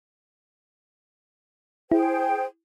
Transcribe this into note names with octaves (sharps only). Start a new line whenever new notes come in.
E4 G#4 C5 G5